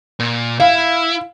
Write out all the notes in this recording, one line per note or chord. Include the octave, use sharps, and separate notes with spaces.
A#2
E4 F5